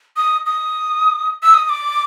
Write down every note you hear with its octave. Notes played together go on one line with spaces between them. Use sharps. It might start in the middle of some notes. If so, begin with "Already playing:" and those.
D#6
D#6
E6
D#6
D#6
D6